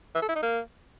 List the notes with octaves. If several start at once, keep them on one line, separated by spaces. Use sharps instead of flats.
E3
A4
E4
D#4
A#3